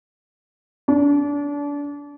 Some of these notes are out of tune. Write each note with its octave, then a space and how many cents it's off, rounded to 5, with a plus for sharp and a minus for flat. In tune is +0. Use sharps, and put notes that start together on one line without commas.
D4 -30